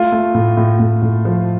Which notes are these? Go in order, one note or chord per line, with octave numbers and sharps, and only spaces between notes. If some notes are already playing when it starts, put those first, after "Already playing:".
Already playing: A3 F4
A3
A2
A2
A2
A2
F3